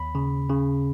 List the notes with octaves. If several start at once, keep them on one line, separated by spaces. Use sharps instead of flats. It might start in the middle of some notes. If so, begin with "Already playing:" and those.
Already playing: D#2 B5
C#3
C#3